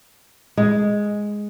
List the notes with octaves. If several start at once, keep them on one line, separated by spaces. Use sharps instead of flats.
G#3